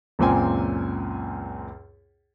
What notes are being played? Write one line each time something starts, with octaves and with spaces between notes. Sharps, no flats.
C#2 F#2 A#2 C4 G5 G#5